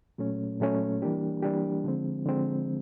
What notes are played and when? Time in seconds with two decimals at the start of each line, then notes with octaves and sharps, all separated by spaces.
0.18 A#2 F#3 A3 C#4
0.60 A#2 F#3 A3 C#4
1.02 E3 G3 A#3 D4 G4
1.43 E3 G3 A#3 D4 G4
1.84 D3 F3 G#3 C4
2.26 D3 F3 G#3 C4